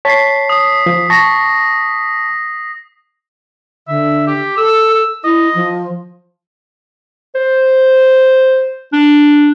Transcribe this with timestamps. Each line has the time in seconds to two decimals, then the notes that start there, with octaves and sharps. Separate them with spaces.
0.05 C#5 A5 B6 C7
0.49 D#6
0.86 F3
1.10 A5 C#6 A#6
3.88 D3 E5
4.27 G4
4.57 A4 E6
5.24 E4 D#5
5.55 F3
7.35 C5
8.93 D4